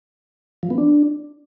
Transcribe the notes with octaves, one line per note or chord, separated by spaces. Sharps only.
F3
B3
D4